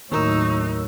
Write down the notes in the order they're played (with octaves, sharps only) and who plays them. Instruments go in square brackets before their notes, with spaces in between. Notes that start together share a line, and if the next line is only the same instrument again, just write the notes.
[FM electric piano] D#2 A#4 E6 [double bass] A2 F#3 [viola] D#4 [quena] C#6